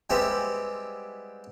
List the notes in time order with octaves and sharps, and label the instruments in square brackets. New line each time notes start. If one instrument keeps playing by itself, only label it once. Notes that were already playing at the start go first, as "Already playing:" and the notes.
[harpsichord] G3 G#3 B3 C4 E4 G4